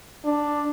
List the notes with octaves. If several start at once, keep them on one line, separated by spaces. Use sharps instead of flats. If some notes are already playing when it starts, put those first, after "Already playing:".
D4